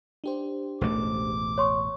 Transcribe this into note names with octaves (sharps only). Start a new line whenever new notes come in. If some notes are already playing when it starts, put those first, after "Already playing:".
D4 G4 C5
E1 A1 A3 D6
C#5 C6 C#6